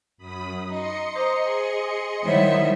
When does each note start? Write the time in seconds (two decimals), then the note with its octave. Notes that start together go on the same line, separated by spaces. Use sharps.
0.18 F#2 B5 D#6
0.70 D#4 D#5 C6 C#7
1.16 C5 A#5 D6 D#6
1.45 G#4
2.24 D#3 G3 E4 C5 C#5 E5 F#5